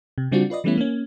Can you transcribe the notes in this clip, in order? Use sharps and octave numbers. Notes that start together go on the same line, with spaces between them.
C3
C#3 G3 C4 D4 F4 F#4
F4 B4 D5 D#5
E3 G3 A3 B3 C#4 E4
A#3 C#4